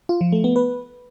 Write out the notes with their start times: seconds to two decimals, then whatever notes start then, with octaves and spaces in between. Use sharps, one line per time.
0.09 F4
0.21 F3
0.32 A3
0.44 B3
0.56 B4